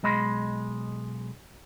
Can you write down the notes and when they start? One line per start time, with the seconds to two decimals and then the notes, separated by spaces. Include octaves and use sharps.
0.03 B1 G#3 D#5 B5 C6